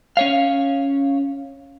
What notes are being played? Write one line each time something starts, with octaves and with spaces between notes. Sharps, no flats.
C#4 C#5 F5